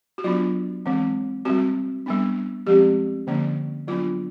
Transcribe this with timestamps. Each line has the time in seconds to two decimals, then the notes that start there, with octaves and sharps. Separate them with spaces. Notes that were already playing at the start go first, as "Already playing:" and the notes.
0.18 F#4
0.24 F#3 B3 D4 F4
0.86 E3 G#3 C4
1.45 G3 C4 F#4
2.06 G3 B3 D4
2.67 F3 G#3 C4 G4
3.27 D3 F3 A#3 C#4
3.88 F#3 B3 D4 F4